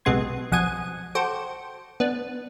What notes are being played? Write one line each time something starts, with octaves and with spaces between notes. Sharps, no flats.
B1 C3 G#3 B3 C6 G#6
B1 F2 F#5 G#5 D#6 G#6
F#4 A4 C5 G5 D6
B3 D4